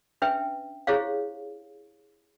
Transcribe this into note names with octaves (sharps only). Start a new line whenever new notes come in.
C#4 D4 B4 E5 G5
E4 G4 G#4 C5 C#5 F5